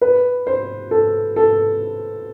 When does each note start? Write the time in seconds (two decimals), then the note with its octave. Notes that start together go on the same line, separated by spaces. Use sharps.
0.01 B4
0.47 C5
0.91 A4
1.36 A4